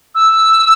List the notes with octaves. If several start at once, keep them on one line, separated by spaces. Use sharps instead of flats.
E6